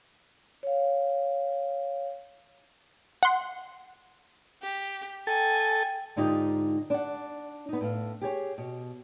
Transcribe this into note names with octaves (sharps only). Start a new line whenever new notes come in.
C#5 F5
F#5 C6
G4
A4 G5 G#5
G#2 D3 D#4 F4 G4 D#5
D4 F#5
B3 D#4
A2 F5
G4 G#4 C#5
B2